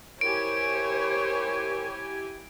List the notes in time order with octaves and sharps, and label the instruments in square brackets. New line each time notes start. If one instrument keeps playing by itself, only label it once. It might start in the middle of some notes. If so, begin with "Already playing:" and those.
[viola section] E4 G4 G#5 [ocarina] A#4 [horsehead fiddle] C5 C#5 [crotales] D7